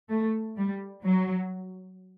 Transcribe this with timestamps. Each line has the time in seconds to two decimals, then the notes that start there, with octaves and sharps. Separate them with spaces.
0.10 A3
0.57 G3
1.04 F#3